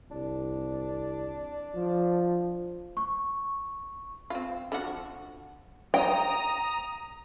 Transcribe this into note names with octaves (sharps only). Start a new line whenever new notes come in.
C2 D4
F3
C#6
C4 F4
D3 F3 F#4
G5 A#5 D#6